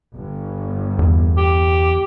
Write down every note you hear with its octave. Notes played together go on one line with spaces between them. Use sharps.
G1
E2
G4